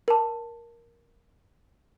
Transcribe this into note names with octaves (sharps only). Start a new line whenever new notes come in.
A#4 A5